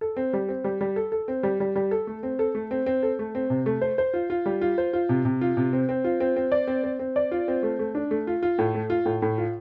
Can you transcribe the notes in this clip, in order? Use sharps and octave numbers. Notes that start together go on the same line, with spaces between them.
A4
C4
G3
C4
G3
G3
A4
A4
C4
G3
G3
G3
A4
A3
C4
A4
A3
C4
C4
A4
A3
C4
C3
A3
C5
C5
F4
F4
G3
F4
C5
F4
C3
C3
F4
C3
C4
C4
F4
C4
C4
D5
C4
C4
C4
D5
F4
C4
A3
A3
D4
A3
F4
F4
A2
A3
F4
A2
A2
F4